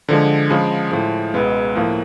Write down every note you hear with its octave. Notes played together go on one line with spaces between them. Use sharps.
D3 F3 G#3
C#3 F3 G#3
A2 F3 G#3
C#2 B2 G#3 B3
A2 F3 A#3